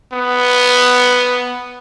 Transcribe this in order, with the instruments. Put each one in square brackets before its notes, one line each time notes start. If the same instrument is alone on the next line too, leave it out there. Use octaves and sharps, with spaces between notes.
[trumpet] B3